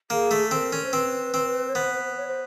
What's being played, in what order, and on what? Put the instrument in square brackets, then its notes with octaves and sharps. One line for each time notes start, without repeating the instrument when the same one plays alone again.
[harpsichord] A#3 [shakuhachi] G#4
[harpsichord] A3
[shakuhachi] A4
[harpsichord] C4 [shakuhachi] A#4
[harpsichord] C#4
[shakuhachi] C5
[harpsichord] C4 [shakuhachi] B4
[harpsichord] C4
[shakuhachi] C#5
[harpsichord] B3 [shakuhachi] C5
[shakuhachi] C#5
C5